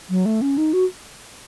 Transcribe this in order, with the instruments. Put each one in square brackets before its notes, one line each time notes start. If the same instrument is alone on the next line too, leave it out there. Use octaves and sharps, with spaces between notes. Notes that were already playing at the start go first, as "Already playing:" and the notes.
[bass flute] F#3
A3
C#4
D#4
F#4